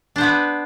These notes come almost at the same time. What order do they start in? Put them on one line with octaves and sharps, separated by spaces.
D4 C5 B3 B4